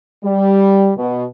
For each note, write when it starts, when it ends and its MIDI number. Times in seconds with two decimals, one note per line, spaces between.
0.24 0.91 55
0.97 1.25 47